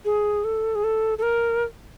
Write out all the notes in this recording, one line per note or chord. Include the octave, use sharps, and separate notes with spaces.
G#4
A4
G#4
A4
A4
A#4